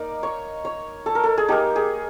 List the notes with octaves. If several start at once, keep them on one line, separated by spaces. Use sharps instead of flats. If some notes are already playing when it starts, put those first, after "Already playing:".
Already playing: A#3 D#4 D5
C#5
C#5
A4
A#4
A4
G#4
A#3 D#4 G4
G#4